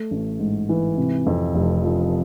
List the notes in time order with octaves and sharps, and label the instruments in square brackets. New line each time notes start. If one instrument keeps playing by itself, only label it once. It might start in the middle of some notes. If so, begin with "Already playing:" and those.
Already playing: [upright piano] A3
A1
G#2
E3
C3
F2
F1
F3